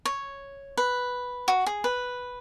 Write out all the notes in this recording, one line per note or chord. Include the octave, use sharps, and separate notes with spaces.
C#5
B4
F#4
G#4
B4